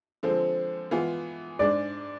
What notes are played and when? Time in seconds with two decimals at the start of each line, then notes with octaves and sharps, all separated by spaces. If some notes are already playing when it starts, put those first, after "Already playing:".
0.23 D3 F3 G#3 C4
0.91 E3 G#3 B3 F4
1.59 G#2 G#3 D4 D5